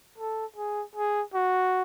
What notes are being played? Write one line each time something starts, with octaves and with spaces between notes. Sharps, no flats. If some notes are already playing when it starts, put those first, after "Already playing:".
A4
G#4
G#4
F#4